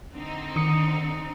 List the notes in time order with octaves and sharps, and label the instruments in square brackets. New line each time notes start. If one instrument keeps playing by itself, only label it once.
[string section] D3 C4 D#4
[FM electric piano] D#3 D#6 C#7